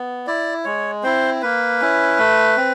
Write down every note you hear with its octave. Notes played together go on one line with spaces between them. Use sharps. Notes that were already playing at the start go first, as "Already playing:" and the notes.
Already playing: B3
E4 D5
G#3 C#5
C4 E4 C5
A#3 B4
C#4 E4
A3
C4